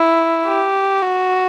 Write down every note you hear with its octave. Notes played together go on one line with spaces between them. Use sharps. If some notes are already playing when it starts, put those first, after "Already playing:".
Already playing: E4
G4
F#4